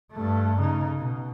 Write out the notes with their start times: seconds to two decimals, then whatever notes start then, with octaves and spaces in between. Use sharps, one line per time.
0.12 G2 A3
0.61 C#3 D#4
0.98 B2